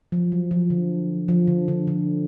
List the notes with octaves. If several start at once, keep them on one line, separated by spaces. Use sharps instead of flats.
F3
F#3
F3
D3
F3
D3
D3
D3